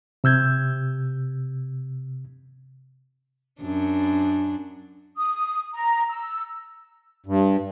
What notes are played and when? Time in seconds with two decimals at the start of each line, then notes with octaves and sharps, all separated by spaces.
0.24 C3 E6 G6 G#6
3.61 F#2 D4
5.16 D#6
5.74 A#5
6.09 E6
7.26 G2